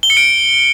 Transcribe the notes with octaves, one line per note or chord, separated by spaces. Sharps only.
G7
C#7
D7